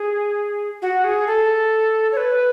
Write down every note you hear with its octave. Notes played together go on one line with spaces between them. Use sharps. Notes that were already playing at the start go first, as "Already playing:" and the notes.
Already playing: G#4
F#4
G#4
A4
C#5
B4